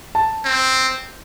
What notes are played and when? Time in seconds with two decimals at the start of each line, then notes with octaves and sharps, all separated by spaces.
0.15 A5
0.45 C4